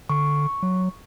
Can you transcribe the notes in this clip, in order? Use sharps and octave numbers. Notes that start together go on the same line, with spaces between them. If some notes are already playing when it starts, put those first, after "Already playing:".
D3 C#6
F#3